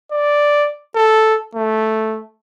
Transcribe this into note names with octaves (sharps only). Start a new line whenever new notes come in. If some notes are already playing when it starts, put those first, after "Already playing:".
D5
A4
A3